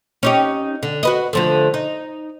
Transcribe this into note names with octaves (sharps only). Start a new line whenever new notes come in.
C#4 D#4 G4
D3
F#4 B4 D#5
D3 F3 A3
D#4